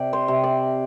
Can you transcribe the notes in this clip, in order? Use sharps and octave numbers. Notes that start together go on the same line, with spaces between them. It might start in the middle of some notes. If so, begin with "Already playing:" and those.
Already playing: C3 D5
C5
C3
D5